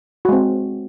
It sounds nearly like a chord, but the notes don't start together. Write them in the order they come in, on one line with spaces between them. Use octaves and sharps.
F#4 G#3 C4